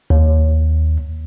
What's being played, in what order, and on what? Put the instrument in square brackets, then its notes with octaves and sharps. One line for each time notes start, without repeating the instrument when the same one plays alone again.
[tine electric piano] D#2